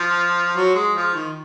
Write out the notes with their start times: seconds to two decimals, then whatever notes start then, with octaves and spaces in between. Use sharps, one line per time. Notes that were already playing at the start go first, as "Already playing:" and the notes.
Already playing: F3
0.55 F#3
0.75 G#3
0.94 F3
1.14 D#3